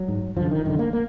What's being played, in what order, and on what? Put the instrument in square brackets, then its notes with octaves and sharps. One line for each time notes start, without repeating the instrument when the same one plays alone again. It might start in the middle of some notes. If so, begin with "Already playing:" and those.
Already playing: [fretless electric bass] F#3
G#2
F#2 D3 F3
D#3
F#2 D3 D#3
A#3
A#3